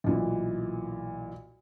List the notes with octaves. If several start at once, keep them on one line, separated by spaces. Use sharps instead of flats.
B1 A#2 E3